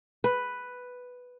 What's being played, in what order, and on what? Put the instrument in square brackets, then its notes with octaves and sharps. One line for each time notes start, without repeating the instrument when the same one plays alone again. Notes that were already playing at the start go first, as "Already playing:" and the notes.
[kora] B4